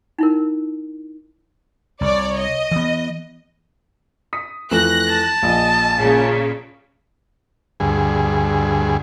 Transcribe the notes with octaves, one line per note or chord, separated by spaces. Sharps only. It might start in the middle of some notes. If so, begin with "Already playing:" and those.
D#4 E4 A#4
C2 C#5 D5
D#5
E3 B3
D#6 B6
F2 E3 A3 F#6 A#6
A5
A#1 D#5
A#2 C#3
D2 G2 G#4